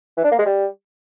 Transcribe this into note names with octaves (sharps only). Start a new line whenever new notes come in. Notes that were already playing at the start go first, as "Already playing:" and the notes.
E3
D4
A#3
G#3
G3